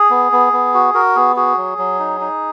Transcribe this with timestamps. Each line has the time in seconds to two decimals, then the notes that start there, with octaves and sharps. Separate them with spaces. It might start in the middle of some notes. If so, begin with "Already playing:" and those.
Already playing: G#4
0.10 B3
0.32 B3
0.53 B3
0.74 F#4
0.94 F#4 A#4
1.16 B3 G#4
1.36 F#4 G#4
1.57 F#3
1.78 F#3
1.99 D#4
2.21 D#4